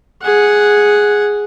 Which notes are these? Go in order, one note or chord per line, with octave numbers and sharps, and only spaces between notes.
G#4 F#5